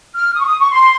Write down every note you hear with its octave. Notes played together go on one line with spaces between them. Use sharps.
F6
D#6
C#6
D#6
C#6
C6